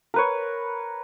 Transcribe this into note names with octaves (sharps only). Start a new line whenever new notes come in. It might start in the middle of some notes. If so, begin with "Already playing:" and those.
A#4 B4 C#5